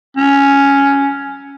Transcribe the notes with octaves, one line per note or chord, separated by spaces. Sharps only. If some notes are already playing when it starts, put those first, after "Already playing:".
C#4